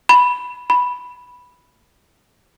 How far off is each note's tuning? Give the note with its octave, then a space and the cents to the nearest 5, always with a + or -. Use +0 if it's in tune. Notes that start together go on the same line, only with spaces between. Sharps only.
B5 -5
B5 -5